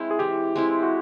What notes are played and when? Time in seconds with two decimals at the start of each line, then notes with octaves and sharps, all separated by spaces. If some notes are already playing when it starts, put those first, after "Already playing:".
Already playing: G#3 C4 E4
0.11 G#4
0.19 E3 G4
0.56 G#3 C4 E4
0.83 F#4